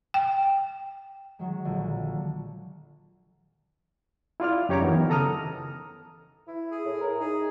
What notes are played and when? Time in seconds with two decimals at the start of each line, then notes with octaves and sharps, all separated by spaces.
0.14 G5
1.39 D#3 F#3 G#3
1.65 A#1 D3
4.40 E4 F4 D5 F6
4.69 F#2 G4 C#5 A#5 D6
4.82 D#3 E3 B3
5.09 C#3 A4 A#5 D#6 F6
6.47 E4
6.71 G#4
6.85 A2
7.01 A#4
7.20 D#4 G#4